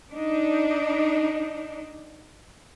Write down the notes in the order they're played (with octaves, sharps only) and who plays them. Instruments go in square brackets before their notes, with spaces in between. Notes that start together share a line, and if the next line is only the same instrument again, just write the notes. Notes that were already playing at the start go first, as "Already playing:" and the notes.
[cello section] D4 D#4